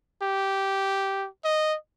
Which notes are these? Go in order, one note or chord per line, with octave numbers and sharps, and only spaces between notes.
G4
D#5